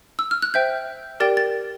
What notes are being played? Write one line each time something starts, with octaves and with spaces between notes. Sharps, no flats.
E6
F6
F#6
C5 E5 G5 G6
G4 A#4 D5 G5 A6
A6